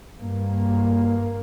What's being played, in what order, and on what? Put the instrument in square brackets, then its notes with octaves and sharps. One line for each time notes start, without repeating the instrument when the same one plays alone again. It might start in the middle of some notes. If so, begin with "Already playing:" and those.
[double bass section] G2 A#3